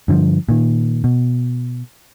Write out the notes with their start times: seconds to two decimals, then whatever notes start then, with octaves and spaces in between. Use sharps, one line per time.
0.08 G2 D3 E3 F3
0.49 A#2 D#3
1.04 B2